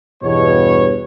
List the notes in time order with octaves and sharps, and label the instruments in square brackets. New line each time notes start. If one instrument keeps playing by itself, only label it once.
[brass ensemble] E2 G2 B2 C#5